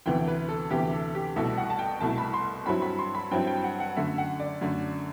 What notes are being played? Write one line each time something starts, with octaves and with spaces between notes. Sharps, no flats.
D2 C3 E3 B3 G5
B4
A4
D2 C3 E3 B3 G4
A4
G4
C2 B2 A3 E4 A4
F#5
A5
G5
C2 B2 A3 E4 A5
B5
C6
G2 F#3 C4 E4 B5
B5
C6
B5
G2 F#3 C4 E4 G5
G5
F#5
F#5
F#2 D3 A3 E5
F#5
D5
F#2 D3 A3